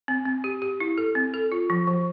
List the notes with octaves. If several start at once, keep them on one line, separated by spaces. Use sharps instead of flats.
C4
C4
G4
G4
E4
A4
C4
A4
F4
F3
F3